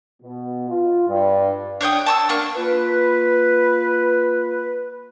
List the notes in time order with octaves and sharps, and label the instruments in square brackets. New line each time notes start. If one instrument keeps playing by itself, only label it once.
[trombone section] B2
F4
G2
[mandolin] D4 C#5 G5 D#6
A5 C#6 E6
A#3 D4 C#6
[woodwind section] A#3 F4 B4